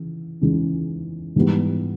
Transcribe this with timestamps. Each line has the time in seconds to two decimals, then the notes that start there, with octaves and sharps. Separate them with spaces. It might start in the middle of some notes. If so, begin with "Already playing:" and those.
Already playing: C#3 E3
0.41 C#3 E3 G#3 C#4
1.36 G#2 E3 G3 B3